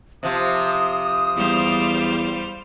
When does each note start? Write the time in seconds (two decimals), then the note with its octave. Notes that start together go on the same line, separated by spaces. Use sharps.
0.23 C3 F3 D#6
1.36 E2 G3 C5 F5